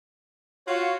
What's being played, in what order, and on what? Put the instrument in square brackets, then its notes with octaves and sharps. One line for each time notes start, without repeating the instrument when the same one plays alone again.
[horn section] F4 F#4 [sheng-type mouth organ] C#5